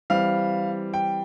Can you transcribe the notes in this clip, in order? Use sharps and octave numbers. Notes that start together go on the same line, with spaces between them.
E3 G3 C4 F5
G5